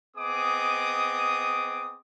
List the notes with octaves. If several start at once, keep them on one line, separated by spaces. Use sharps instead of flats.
B3 C4 G#4 D#5 D6 D#6